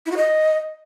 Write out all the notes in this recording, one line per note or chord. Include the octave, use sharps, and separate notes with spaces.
E4
F#4
D#5